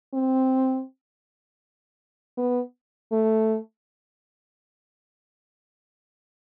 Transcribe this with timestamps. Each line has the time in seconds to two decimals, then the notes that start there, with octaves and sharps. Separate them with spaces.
0.14 C4
2.37 B3
3.12 A3